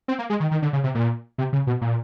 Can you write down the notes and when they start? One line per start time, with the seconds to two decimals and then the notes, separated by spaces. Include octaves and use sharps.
0.08 C4
0.19 A#3
0.30 G#3
0.40 D#3
0.51 D#3
0.62 D3
0.73 C#3
0.84 C3
0.95 A#2
1.38 C3
1.53 C#3
1.67 B2
1.81 A#2